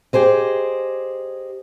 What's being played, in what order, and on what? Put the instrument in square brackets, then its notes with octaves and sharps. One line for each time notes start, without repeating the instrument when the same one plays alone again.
[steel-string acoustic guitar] G4 G#4 C5 D#5